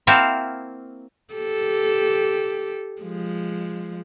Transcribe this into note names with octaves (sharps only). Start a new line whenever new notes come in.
A#3 C4 E4 F#4 E5 F5
G4 A4
F3 G#3